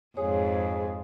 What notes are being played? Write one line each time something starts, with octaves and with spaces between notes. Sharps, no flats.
F2 G#2 G#4 C#5